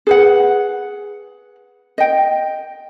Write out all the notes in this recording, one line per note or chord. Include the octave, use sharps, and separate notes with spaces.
G#4 B4 F#5
D#5 G5